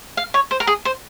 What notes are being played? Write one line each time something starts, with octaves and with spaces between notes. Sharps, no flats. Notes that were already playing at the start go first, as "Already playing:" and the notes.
F5
C#5
C5
A#4
G#4
C5